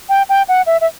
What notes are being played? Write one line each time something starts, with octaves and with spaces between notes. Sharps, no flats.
G5
G5
F#5
E5
E5